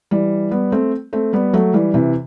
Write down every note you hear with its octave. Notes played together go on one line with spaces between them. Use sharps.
E3 G3
G3 B3
A3 C4
A3 C4
G3 B3
F#3 A3
E3 G3
C3 E3